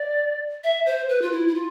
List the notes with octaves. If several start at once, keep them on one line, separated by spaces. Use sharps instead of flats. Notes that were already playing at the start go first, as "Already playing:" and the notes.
Already playing: D5
E5
C5
B4
F4
E4
E4
F4